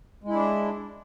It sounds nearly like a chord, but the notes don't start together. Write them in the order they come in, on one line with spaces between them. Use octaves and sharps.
G#3 E4 D4